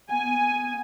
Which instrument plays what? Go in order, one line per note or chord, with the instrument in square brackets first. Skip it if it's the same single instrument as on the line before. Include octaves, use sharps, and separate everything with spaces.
[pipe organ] B3 [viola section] G#5